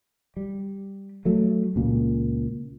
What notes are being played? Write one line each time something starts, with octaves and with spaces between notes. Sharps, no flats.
G3
F#3 A3
C#2 A#2